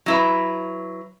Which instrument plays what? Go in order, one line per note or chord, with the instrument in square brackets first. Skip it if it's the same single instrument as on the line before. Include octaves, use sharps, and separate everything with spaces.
[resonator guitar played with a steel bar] F#3 E4 B4